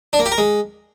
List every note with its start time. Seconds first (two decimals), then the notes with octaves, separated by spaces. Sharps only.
0.13 D4
0.19 A#3
0.25 G4
0.32 A#4
0.38 G#3